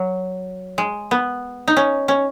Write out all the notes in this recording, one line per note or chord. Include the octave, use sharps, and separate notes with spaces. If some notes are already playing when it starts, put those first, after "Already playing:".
Already playing: F#3
G#3
B3
D#4
C#4
C#4